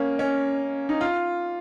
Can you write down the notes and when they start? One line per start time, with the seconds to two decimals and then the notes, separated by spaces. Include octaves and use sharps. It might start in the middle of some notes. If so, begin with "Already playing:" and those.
Already playing: A#3 C#4
0.19 C#4
0.89 D#4
1.01 F4